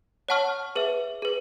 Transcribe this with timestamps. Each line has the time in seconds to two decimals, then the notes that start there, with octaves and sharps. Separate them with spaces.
0.29 C#5 F#5 A5 C#6 F6
0.75 G#4 B4 E5
1.22 G#4 B4